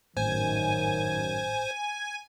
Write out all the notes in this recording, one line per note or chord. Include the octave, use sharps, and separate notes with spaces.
G#1 F#2 A2 D#3 C5 G#5